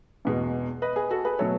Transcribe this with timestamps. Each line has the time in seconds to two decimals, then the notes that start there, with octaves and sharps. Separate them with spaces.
0.25 E2 B2 G#3
0.82 B4 D#5
0.96 G#4 B4
1.11 F#4 A4
1.25 G#4 B4
1.39 B2 F#3 A3 A4 C#5